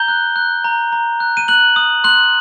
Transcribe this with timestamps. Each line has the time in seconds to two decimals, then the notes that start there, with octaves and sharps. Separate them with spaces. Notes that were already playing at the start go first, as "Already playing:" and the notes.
Already playing: A#5 G6 G7
0.08 F#6
0.36 F#6
0.64 A#5
0.92 A#5
1.20 F#6
1.37 D#7
1.48 F#6 F#7
1.76 D#6
2.04 C6 F#6 F#7